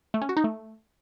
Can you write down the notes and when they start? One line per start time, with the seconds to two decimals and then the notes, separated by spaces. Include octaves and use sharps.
0.14 A3
0.22 C#4
0.29 F#4
0.37 D#4
0.44 A3